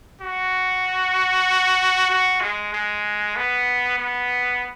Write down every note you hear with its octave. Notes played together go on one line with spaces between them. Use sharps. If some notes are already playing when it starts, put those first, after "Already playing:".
F#4
F#4
G#3
G#3
B3
B3